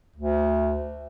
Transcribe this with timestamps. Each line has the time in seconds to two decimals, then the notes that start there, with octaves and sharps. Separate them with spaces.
0.16 D2